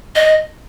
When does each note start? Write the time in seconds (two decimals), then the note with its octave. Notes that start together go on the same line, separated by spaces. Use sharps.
0.15 D#5